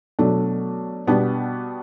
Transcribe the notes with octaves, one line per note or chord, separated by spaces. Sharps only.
B2 F#3 A3 D4
B2 G3 B3 D4 G4